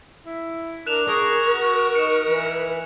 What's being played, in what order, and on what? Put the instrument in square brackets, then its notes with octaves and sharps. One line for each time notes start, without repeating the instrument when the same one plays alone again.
[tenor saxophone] E4
[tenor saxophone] D4 [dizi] A#4 [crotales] F#6 E7 F7
[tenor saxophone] G#4 [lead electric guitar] A#4 [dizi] C#6
[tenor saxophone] F#4
[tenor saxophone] D#4 [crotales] C#7 E7
[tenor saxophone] E3 [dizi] B4